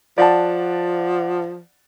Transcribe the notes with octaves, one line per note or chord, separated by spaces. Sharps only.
F3 D5 F#5 A5